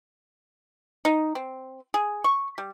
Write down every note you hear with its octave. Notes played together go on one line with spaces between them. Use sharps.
D#4
C4
G#4
C#6
G3